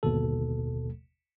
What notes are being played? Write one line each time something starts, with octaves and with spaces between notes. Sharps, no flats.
G1 D#2 B2 A4